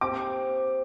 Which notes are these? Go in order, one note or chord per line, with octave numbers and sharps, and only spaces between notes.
C4 G4 C5 D6